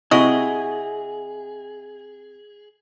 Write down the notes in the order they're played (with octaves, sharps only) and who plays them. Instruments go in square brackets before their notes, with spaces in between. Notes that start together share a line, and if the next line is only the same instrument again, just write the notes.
[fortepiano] C3 [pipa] E4 F#4 D#5 [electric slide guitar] G#4